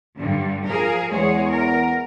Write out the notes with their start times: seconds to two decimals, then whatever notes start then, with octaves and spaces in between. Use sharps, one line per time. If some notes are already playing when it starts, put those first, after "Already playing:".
0.16 G2 D3
0.67 F3 G#4 A#4
1.12 E2 G#3 G#4 C#5
1.50 A#4